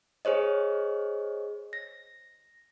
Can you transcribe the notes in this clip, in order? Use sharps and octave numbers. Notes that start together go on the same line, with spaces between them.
G#4 C5 C#5 D#5
A#6